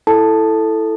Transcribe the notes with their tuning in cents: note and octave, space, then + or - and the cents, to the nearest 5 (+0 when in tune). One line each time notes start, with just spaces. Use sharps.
E4 +0 A4 +0 A5 +0